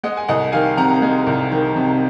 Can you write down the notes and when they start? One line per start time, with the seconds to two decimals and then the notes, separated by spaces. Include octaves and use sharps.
0.04 G#3 D#5 F#5
0.17 G#5
0.28 C2 D#5 F#5
0.52 D#3 F5 G#5
0.77 C3 F#5 A#5
1.02 G#3
1.27 C2
1.52 D#3
1.76 C3